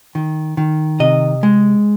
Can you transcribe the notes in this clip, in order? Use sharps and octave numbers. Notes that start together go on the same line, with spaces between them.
D#3
D#3
C3 D#5
G#3